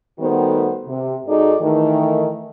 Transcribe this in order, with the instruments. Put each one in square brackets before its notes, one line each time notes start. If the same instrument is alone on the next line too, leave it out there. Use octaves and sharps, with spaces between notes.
[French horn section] D#3 G3 A3 B3 F#4 C5
C3
G#2 D#4 F#4 G#4 A4 D5
D#3 E3 A3